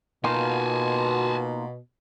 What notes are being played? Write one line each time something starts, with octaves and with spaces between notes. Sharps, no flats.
B2 A#3 D#4 F4 G#5 A5